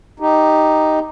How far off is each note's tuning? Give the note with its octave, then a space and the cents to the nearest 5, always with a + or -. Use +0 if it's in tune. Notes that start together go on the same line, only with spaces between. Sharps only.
D#4 +0 G4 +0